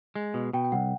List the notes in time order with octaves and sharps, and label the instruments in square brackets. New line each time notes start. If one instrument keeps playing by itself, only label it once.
[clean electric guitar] G#3
B2
[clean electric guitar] B2 [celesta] G5
[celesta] G5
[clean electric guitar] C2 [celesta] F#5